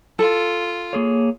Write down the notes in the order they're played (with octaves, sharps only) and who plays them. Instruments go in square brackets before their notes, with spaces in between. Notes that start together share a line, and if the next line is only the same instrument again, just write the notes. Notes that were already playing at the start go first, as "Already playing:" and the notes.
[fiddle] F4 [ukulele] A4
[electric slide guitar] A#3 G#4 C#5